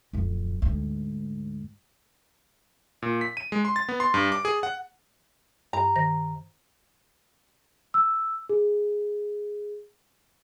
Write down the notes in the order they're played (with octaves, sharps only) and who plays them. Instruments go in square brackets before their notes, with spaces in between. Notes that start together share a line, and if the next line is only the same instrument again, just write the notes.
[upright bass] D1 F2
D2 G#2
[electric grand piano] A#2
B6
D#7
G#3
C6
A6
B3
C6
G2
D6
G#4
F#5
[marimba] G2 [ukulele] A#5
[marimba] D#3 C5 A#6
[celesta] E6
G#4